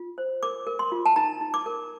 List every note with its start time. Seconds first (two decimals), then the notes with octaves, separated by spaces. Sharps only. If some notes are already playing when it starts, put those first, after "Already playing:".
Already playing: F4
0.18 C5
0.43 A#4 D6
0.67 A#4
0.79 C6
0.92 F4
1.06 A5
1.16 D#4 A#5
1.41 D#4
1.54 D6
1.66 A#4